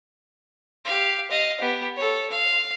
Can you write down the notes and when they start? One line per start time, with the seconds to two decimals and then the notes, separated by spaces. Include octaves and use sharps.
0.85 G4 F5
1.31 D#5 F5
1.60 B3 G4
1.97 A4 C#5
2.30 F5